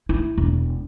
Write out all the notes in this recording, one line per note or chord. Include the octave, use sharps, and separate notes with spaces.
E4
E1